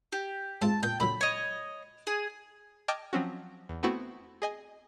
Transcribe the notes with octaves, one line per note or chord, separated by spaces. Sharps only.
G4
G#2 C4 F4 A5
A#2 G5
A#2 D3 F#3 B5
C#5 D#5
G#4
D#5 G5 A5 D6 F6 G#6
F3 F#3 C4 C#4 F#4
E2
A3 B3 C4 E4 F#4
G#4 D#5 G#5